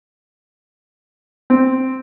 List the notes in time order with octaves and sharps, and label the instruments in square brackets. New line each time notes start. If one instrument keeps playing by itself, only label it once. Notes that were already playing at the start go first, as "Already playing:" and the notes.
[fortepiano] C4